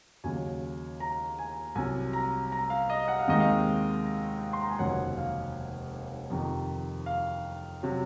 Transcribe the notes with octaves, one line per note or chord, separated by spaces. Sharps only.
D#2 C#3 F#3 G#5
A#5
G#5
C2 C3 F#3 G#5
A#5
A#5
F5
D#5
F#5
F5
D#2 D#3 G#3 C4 D#5
F5
C6
A#5
G#5
F1 D#2 C#3 F#3 C#4 F#5
F5
F2 C3 D#3
F5
C3 F#3